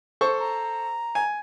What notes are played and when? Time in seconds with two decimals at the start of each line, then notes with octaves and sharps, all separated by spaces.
0.21 A4 C5 C#6
0.39 A#5
1.15 G#5